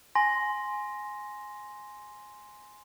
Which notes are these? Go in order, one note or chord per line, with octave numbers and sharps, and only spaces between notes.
G#5 C6 A#6